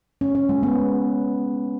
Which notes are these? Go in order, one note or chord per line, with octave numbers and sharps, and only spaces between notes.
C#4
C#4
G#3
B3